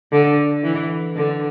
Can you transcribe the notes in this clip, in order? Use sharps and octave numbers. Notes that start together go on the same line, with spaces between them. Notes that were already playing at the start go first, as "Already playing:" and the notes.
D3
E3
D3